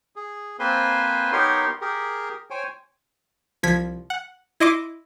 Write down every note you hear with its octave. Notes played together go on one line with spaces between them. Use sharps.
G#4
A#3 C4 B4 C5 G#5 C6
B3 D#4 G4 A#4 C#5 C6
G4 G#4 A#4
C5 C#5 G5 G#5
C2 F3 G#6 B6
F#5
E4 D#5 C6 D6